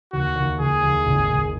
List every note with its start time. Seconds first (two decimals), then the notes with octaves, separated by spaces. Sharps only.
0.12 D#2 F#4
0.36 D#2
0.59 D#2 G#4
0.83 D#2
1.06 G#1
1.30 G#1